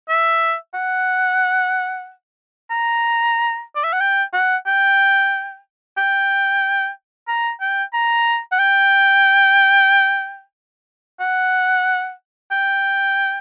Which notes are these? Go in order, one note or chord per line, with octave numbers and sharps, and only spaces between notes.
E5
F#5
A#5
D5
E5
F#5
G5
F#5
G5
G5
A#5
G5
A#5
F#5
G5
F#5
G5